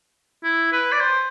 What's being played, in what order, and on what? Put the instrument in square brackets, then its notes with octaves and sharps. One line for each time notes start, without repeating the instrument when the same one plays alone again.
[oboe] E4
B4
D5
C5